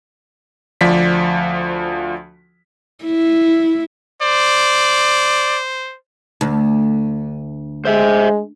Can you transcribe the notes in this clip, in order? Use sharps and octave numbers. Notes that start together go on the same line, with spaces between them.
D2 F3 D5 B6
E4
C5 D5
D2
G#3 C5 E5